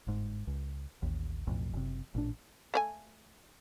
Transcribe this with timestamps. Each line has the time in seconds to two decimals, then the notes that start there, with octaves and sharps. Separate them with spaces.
0.07 G1 G#2
0.47 C#2
1.03 A1 D#2
1.47 B1 F2 A2
1.74 F#1 C3
2.15 A1 A#2 D4
2.74 A3 D5 G#5